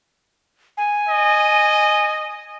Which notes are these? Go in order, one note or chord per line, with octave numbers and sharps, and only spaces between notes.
G#5
D#5